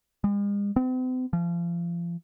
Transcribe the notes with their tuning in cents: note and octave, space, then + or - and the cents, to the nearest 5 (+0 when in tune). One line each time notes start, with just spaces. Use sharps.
G#3 -45
C4 -45
F3 -35